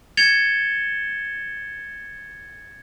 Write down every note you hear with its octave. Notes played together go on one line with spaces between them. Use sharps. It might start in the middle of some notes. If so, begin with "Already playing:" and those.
G#6 A6 C#7 E7 F7 G7